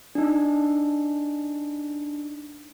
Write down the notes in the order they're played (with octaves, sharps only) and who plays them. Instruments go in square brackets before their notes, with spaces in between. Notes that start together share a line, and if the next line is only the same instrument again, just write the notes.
[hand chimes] D4 D#4